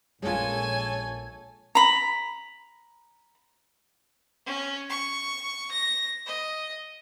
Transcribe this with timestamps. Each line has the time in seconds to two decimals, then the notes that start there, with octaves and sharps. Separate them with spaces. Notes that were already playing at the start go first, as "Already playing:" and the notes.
0.23 A#1 G#3 C#4 F4 A4 C#5 G#5
1.75 A#5 B5
4.46 C#4
4.89 C#6
5.72 A#6
6.27 D#5